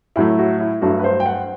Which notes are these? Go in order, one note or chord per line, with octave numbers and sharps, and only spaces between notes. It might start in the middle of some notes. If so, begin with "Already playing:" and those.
A2 F#3 A3 E4
F#4
E4
G2 F#3 A3 F#4
B4
C5
G5
F#5